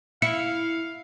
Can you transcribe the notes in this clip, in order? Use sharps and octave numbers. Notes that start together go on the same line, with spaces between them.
E4 F5 C#7